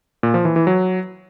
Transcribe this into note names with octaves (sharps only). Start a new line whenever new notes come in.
A#2
F3
E3
E3
F#3